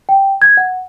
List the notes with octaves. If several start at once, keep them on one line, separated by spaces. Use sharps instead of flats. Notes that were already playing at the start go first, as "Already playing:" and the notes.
G5
G#6
F#5